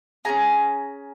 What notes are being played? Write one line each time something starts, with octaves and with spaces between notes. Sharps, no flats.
C#4 F4 G#4 A#5